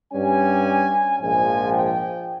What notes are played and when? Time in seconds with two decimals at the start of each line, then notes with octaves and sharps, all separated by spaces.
0.13 G2 G3 C#4 G#5
1.19 A#1 G#2 F3 G#5
1.72 G5